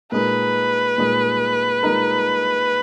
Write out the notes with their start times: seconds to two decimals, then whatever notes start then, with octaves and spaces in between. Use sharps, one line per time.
0.12 A#2 G#3 D#4 A#4 B4
0.98 A#2 G#3 D#4 A#4
1.83 A#2 G#3 D#4 A#4